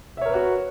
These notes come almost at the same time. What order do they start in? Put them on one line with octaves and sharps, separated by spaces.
E5 C#5 A#4 B4 F#4